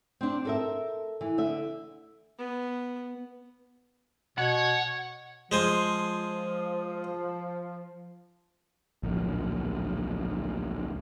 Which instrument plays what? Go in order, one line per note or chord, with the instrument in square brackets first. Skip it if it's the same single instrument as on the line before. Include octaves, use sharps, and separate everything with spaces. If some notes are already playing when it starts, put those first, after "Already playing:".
[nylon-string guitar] C4 D4
A4 A#4 E5
E3
D3 E5
[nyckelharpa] B3
[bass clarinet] B2 [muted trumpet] C#5 [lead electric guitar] F#5
[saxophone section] F3 [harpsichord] G#3 C5 G#5
[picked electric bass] D1 A#1